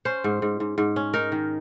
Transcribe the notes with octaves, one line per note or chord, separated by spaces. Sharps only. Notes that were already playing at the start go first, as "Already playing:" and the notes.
C#4 C5
G#2
G#2
G#2
G#2
C#4
D#4 A#4
D#3